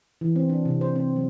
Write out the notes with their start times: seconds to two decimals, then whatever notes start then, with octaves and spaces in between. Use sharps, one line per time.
0.21 E3
0.36 C4
0.49 D4
0.65 C3
0.81 C5
0.96 C4
1.16 F#3